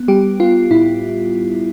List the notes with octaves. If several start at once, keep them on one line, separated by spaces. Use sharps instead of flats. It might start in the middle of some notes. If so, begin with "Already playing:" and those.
Already playing: B3
G3 G4
B3 F4
A2 E4